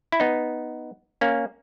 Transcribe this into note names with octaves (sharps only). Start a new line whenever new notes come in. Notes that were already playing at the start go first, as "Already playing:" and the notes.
E4
B3 D#4
A#3 C#4